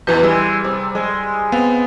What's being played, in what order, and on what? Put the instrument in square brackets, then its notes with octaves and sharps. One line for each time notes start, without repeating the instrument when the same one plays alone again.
[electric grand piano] E2 E3 G6 [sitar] B2 [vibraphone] B4
[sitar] E3 G#3 [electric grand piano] G3 [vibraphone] E6
[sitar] C3
G#3
[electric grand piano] B3 C4 [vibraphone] F5